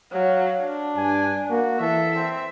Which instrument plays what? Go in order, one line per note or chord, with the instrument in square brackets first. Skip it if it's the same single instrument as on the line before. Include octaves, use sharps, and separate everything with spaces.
[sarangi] F#3 [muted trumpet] F5
[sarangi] D4
[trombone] G2 [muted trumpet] G#5
[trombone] A#3 [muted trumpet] F#4
[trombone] E3 [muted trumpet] A4 [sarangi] E5
[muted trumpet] C4